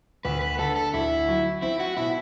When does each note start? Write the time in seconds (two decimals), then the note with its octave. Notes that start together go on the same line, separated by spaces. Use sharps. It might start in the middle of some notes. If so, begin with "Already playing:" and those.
0.25 D2 B4
0.41 B4
0.59 D3 A4
0.76 A4
0.94 D2 E4
1.29 F#3
1.62 C4 E4
1.80 F#4
1.97 B2 E4